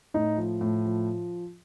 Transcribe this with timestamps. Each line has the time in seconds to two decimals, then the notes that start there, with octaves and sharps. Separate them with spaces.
0.14 A2 D#4 D#5
0.37 F3
0.61 A2
0.85 F3